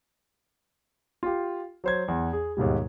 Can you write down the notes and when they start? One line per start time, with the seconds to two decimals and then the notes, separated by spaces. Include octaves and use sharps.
1.23 F4 G4
1.84 F#3 C5 G#6
2.08 E2
2.33 G#4
2.57 D#2 G#2 B2 G3